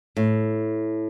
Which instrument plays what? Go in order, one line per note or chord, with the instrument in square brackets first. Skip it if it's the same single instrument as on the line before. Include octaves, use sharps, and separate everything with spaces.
[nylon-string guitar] A2